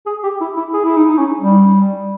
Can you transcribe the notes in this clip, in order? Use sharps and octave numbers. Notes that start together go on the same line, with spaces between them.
G#4
G4
E4
E4
G#4
E4
D#4
D#4
C#4
G3